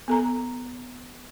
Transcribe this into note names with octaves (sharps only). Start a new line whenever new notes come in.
B3 A4 A#5